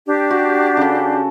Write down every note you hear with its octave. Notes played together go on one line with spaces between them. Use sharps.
D4 G4
F#4
C#3 A4